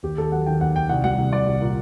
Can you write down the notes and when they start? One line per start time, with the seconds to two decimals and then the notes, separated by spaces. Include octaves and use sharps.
0.03 D#2 G4
0.17 D#2 A4
0.32 F#3 F#5
0.46 D#3 G5
0.61 D#2 F#5
0.75 D#2 G5
0.89 C2 F#5
1.04 G3 F#5
1.18 C2
1.32 C2 D5
1.47 C2
1.61 A#2